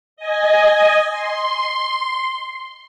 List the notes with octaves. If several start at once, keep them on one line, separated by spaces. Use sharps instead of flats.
D#5 G#5
C6